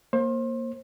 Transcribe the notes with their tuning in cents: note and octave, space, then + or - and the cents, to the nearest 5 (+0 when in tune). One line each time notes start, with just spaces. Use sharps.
A#3 +0 C5 +30